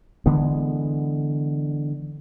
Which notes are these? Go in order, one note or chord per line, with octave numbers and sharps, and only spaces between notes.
D3 E3 G#3 B3